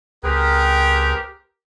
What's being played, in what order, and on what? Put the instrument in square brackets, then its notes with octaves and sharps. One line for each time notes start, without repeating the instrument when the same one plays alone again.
[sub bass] C#2 [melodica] C4 G#4 B4 [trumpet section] G4 A#4